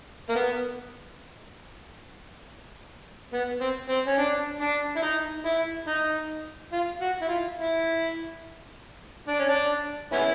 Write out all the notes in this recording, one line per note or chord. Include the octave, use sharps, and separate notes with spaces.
A#3
B3
B3
C4
C4
C#4
D4
D4
E4
D#4
E4
D#4
F4
F#4
E4
F4
E4
D4
C#4
D4
B3 C#4 E4